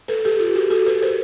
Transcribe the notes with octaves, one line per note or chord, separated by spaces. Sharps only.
A4 B4
G4 A4
F4 G4
F#4 G#4
G4 A4
A4 B4
A#4 C5